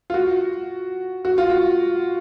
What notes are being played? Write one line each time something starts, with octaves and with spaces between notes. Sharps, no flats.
F4
F#4
F#4
F4
F#4